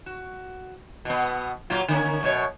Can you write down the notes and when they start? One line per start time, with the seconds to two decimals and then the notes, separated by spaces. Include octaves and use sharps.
0.06 F#4
1.05 B2 B3
1.70 A#2 F#3 F4
1.88 D3 A#3 C#4
2.23 F#2 B2 C#5